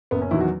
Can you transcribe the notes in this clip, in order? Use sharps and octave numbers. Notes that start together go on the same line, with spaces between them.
F#1 B3
C#4
E2 D#3 F#3 E4
F#4